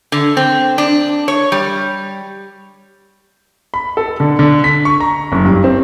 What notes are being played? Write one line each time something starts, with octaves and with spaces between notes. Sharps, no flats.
D3
C4
D4
C#5
G3
B5
A4
D3
D3
B6
C#6
A#5
F#1
G2
C4